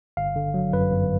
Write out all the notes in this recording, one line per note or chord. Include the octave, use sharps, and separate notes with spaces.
G1 F5
D3
F#3
F#2 B4
G1